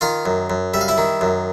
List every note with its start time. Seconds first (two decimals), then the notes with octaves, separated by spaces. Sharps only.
0.01 D#3 F4 F5
0.26 F#2
0.50 F#2
0.74 G3 E5
0.81 F5
0.88 E4 E5
0.98 D#3
1.21 F#2